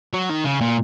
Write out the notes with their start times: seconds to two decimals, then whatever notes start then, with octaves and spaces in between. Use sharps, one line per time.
0.13 F#3
0.29 D#3
0.45 C#3
0.61 A#2